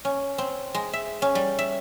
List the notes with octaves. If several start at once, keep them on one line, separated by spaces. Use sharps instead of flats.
C#4
C4
G#3
E5
C#4
G3
E5